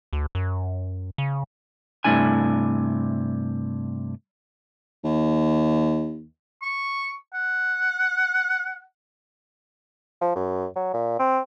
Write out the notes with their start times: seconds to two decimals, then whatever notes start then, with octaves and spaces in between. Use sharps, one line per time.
0.13 D2
0.35 F#2
1.18 C#3
2.04 G2 C3 A3 D4 E4 G#5
5.04 D#2
6.62 C#6
7.34 F#5
10.21 F3
10.36 F#2
10.76 F#3
10.94 A#2
11.19 C4